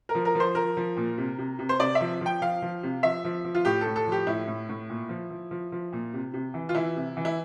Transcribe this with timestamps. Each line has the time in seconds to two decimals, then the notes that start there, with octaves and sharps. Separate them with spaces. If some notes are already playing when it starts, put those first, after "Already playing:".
0.09 A#4
0.15 F3
0.25 A#4
0.35 F3
0.40 C5
0.55 F3 A#4
0.77 F3
0.97 A#2
1.18 C3
1.38 C3
1.59 C3
1.69 C5
1.80 C3 D5
1.95 E5
2.01 F3
2.21 F3 G5
2.42 F3 F5
2.62 F3
2.83 C3
3.03 F3 E5
3.25 F3
3.45 F3
3.55 F4
3.65 A2 G4
3.81 A2 A4
3.96 A4
4.07 F3 G4
4.27 A2 E4
4.48 A2
4.69 A2
4.90 A#2
5.09 F3
5.31 F3
5.51 F3
5.72 F3
5.93 A#2
6.14 C3
6.34 C3
6.54 E3
6.69 F4
6.75 E3 E4
6.96 C3
7.17 E3
7.25 E4